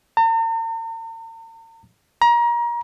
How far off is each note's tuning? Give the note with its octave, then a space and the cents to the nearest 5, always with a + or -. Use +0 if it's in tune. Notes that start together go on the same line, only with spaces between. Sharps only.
A#5 -45
A#5 +30